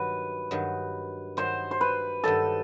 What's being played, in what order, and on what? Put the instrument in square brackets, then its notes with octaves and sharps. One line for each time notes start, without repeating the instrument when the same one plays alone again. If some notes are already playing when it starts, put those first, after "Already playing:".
Already playing: [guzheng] G2 D#3 F#3 [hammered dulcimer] B4
[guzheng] G2 D#3 F#3
[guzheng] G2 D#3 F#3 [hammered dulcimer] C5
[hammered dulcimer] C5
B4
[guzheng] G2 D#3 F#3 [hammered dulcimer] A4